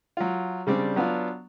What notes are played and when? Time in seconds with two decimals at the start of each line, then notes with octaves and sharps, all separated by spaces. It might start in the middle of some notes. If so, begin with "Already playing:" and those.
0.17 F#3 F4
0.67 C#3 G3 C4 D4
0.96 F#3 B3 D4 F4 F5